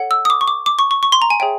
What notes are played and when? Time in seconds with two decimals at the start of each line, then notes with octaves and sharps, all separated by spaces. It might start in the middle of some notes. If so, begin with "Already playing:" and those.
Already playing: A4 C#5 F#5
0.11 E6
0.25 D#6
0.30 D6
0.41 C#6
0.48 D6
0.66 D6
0.79 C#6
0.91 C#6
1.03 C#6
1.12 C6
1.22 A#5
1.30 G#5
1.40 G#4 C#5 E5 G5